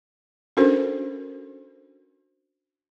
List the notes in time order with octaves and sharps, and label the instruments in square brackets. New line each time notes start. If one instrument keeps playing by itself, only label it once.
[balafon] C#4 D4 F#4 A4 A#4 C5